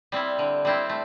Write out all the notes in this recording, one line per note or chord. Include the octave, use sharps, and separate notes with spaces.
G3 C4 E4
D3
G3 C4 E4
A3